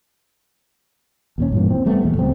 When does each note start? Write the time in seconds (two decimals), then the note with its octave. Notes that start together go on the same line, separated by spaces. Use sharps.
1.38 D#2 A#2 C#4
1.52 G2 A#2 E3
1.70 C4
1.86 G3 A3 B3
2.04 E2 A#2
2.17 C#2 F#2 C4